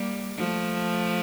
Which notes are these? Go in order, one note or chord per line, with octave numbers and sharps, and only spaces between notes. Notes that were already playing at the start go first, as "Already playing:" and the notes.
Already playing: G3 A#3
F3 A3